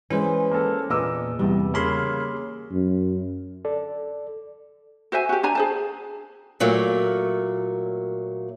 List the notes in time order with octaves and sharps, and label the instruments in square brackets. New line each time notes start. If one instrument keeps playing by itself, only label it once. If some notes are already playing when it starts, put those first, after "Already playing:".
[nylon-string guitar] E3 G#3 [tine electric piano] C#4 C5
[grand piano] A#3 A4
[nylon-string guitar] E2 [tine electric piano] A#2 [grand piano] D#5 D6 E6
[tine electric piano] E2 C3 E3 [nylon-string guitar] G3
[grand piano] C#3 A#3 [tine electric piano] C#5 B5 C6
[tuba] F#2
[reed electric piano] A4 D5
[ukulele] F#4 C5 E5 G#5
F#4 G4
D4 C5 G#5 A#5
G#4 C5 A5
[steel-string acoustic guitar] A#2 F#3 A3 A#3